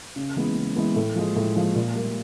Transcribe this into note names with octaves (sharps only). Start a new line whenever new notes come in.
C#3
E3 G#3 B3
C#3
E3 G#3 B3
A2
F3 G#3
A2
F3 G#3
A#2
G3 A#3